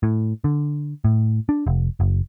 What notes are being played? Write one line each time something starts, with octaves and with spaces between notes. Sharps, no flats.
A2
D3
A2
D4
F1
F#1